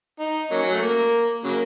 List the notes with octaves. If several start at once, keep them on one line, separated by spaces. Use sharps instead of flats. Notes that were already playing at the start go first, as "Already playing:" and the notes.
D#4
F#3 A#3 C#4
F#3
A3
A#3
C#3 F#3 A#3